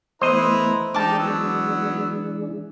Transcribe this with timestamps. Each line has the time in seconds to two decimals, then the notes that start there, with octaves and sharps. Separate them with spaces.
0.21 E3 A3 B3 E4 B4 C5 D#5 A#5
0.94 D#3 E3 G#3 D4 D#4 G4 A5 D6
1.19 F#3 B3 E6